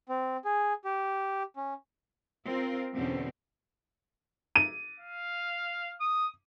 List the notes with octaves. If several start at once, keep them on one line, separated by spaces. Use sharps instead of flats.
C4
G#4
G4
C#4
C4 F4 A#4
E2 B2 D3 C4 C#4
D#7
F5
D#6